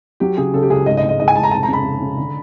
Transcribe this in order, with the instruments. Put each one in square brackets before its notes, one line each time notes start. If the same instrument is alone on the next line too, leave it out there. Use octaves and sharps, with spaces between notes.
[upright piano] F#3 [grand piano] G4
[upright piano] C#3 [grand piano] G#4
[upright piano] C#3 [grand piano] A4
[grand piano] G4
[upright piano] C#2 [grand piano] G#4
[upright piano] G#2 [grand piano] D#5
[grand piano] D#5
[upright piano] G#2
[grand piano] D#5
[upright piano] G#2 [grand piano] D#5
[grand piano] G#5
[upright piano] G#2 [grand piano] A5
[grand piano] A#5
[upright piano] F1 [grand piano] A5
[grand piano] A#5
[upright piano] C#3
[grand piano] B5
[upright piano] C#3
C#3
D3